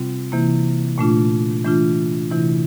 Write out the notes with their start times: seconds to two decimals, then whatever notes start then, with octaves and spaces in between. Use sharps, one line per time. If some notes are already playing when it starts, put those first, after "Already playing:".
Already playing: C3 G3 C4 F4
0.32 C3 E3 A#3 E4
0.98 A#2 A3 D4 F4
1.64 E3 A3 D4 F4
2.30 C3 E3 A3 E4